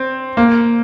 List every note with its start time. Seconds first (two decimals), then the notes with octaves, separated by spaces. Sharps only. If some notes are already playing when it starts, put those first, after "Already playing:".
Already playing: C4
0.37 A#3